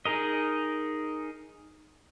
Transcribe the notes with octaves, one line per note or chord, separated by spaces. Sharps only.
D#4 G#4 A#4 D#5